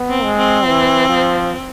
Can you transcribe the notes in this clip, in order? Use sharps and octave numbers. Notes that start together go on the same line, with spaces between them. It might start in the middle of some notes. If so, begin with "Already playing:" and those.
Already playing: B3
C4
G#3
C4
E3
F3